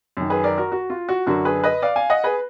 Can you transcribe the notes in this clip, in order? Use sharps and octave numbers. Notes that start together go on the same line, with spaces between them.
F#2 D#3
G#4 B4
A#4 D5
F#4 A#4
F#4
F4
F#4
F#2 D3 F#4 A#4
G#4 B4
B4 D#5
D5 F5
F5 G#5
D#5 F#5
G#4 B4